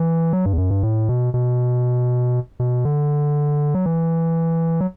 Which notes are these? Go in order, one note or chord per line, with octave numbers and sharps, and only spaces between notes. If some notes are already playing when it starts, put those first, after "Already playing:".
Already playing: E3
F#3
G2
E2
F#2
G2
A2
B2
B2
B2
D3
F#3
E3
F#3